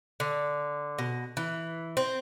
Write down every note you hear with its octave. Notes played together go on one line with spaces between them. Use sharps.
D3
B2
E3
C4